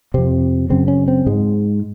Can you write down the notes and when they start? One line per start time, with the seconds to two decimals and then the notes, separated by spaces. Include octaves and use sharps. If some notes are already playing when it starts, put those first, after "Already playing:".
0.14 F2 C3 C4
0.70 F#2 C#3 C4
0.88 C#4
1.08 C4
1.26 G#2 G#3